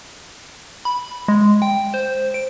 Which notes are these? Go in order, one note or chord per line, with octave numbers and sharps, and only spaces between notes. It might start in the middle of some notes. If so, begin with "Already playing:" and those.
B5
G#3
G5
C5
D7